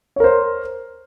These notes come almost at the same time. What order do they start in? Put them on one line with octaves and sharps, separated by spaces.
C#5 A#4 C5